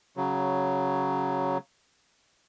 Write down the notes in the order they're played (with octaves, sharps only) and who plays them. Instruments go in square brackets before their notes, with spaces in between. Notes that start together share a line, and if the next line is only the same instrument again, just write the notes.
[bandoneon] C#3 F#3